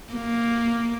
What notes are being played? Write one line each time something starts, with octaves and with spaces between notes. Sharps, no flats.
A#3